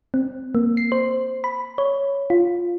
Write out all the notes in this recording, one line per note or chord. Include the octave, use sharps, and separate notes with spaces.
C4
A#3
C7
C5
B5
C#5
F4